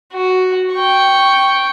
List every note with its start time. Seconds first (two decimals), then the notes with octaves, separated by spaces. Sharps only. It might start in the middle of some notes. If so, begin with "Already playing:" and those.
0.14 F#4
0.74 G5 C#6